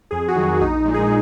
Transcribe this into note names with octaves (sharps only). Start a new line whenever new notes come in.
F2 G#4
F#4
D#3 F#3
A#1 D#4
A#2 G#3
G#4